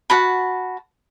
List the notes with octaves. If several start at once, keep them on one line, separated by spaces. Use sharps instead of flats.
F#4 A5 B5